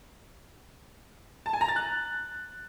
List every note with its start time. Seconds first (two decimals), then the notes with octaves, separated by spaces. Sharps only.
1.46 A5
1.53 G#5
1.61 A#5
1.68 A6
1.76 F#6